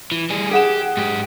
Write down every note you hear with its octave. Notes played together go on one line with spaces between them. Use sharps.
E3
G3 G#4
G4 G#4 F#5 E7
G#2 G4